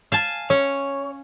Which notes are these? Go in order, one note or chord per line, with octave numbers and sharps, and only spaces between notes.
F5 G#5 A5
C#4 C#5